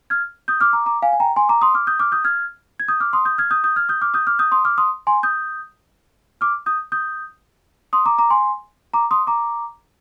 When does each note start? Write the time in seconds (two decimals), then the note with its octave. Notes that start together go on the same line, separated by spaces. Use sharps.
0.10 F6 G#6
0.48 D#6 G6
0.61 D6 F6
0.73 A#5 D6
0.86 A#5 D6
1.02 F5 G#5
1.13 G#5
1.20 G5 A#5
1.36 G#5 C6
1.49 A#5 D6
1.62 C6 D#6
1.74 D6 F6
1.87 D#6 G6
2.00 D6 F6
2.12 D#6 G6
2.24 F6 G#6
2.80 G#6
2.88 D#6 G6
3.00 D6 F6
3.13 C6 D#6
3.25 D#6 G6
3.38 F6 G#6
3.51 D#6 G6
3.64 D#6 G6
3.76 F6 G#6
3.89 D#6 G6
4.01 D6 F6
4.14 D#6 G6
4.27 D6 F6
4.39 D#6 G6
4.52 C6 D#6
4.65 D6 F6
4.78 C6 D#6
5.07 G#5 C6
5.23 D#6 G6
6.41 D6 F6
6.66 D#6 G6
6.92 D#6 G6
7.93 C6 D#6
8.06 A#5 D6
8.18 A#5 D6
8.30 G#5 C6
8.94 A#5 D6
9.11 C6 D#6
9.27 A#5 D6